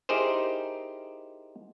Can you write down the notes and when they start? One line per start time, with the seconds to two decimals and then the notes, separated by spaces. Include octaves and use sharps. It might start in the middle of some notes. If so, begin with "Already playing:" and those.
0.09 D#4 E4 G4 G#4 A#4 C5